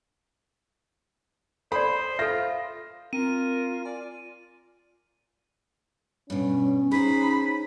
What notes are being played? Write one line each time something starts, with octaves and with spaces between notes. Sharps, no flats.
A4 C5 D5 B5
F4 A4 E5 A#6
C4 F4 A#4 D#7
D5 G#5
G2 B2 C#4
D#4 G#4 C5 B5